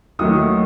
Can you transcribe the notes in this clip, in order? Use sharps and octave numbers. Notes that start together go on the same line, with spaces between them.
D#2 D#3 F#3 A3 D#6